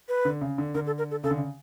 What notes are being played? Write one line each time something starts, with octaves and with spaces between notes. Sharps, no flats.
B4
D3
C#3
D3
D3 A#4
A4
A#4
A4
C#3 A4
D3
C#3